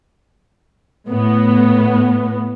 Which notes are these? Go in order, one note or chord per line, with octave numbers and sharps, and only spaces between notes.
A2 B3